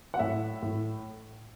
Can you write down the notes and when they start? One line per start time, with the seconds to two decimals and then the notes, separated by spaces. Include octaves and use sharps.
0.14 F#5
0.19 A2 E5
0.63 A2